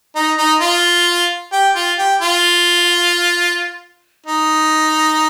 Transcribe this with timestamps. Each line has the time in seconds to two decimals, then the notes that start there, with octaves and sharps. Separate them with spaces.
0.16 D#4
0.38 D#4
0.61 F4
1.52 G4
1.76 F4
1.98 G4
2.21 F4
4.27 D#4